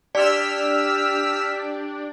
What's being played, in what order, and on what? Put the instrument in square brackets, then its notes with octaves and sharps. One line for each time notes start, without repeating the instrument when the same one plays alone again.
[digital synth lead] D4 [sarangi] G4 [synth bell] D5 [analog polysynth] E6 F6 B6